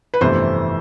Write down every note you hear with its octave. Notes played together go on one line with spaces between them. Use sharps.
B4
G1 F2 C3 E3 A3 C5